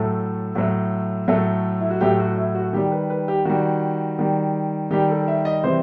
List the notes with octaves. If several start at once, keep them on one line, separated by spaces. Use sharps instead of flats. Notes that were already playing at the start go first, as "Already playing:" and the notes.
Already playing: A2 F#3 A3 A4
A2 F#3 A3
A2 F#3 A3 A4
E4
F#4
A2 F#3 A3 G4
F#4
E4
F#4
D#3 G3 G4
B4
B4
G4
D#3 G3 F#4
D#3 G3
D#3 G3 G4
A4
E5
D#5
C3 E3 G3 C5